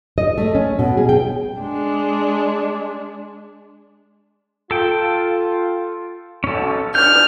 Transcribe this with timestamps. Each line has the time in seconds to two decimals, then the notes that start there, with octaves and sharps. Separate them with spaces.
0.18 D#5
0.38 A3
0.55 C#4
0.79 B2
0.97 G#4
1.09 G5
1.61 G#3 D4
4.71 F4 A4 G5
6.44 B1 C#4 A4
6.95 D4 B4 D5 F6 G6